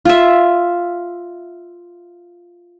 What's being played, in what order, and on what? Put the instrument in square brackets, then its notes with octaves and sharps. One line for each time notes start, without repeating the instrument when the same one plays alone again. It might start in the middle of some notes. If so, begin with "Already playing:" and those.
[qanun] F4 E5